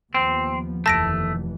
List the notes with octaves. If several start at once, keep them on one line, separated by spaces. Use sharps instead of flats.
D#2 F3 B3 C4
F1 D#2 E3 A3 A5 A#6 D7